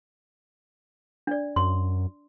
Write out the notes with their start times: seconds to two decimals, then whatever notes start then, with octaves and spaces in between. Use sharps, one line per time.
1.27 D4 D5
1.56 F#2 C6